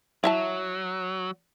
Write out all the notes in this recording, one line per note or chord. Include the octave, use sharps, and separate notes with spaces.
F#3 E4 E5 A5